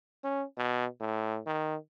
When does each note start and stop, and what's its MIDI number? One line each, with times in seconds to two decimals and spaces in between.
0.24 0.44 61
0.58 0.86 47
1.01 1.40 45
1.47 1.76 51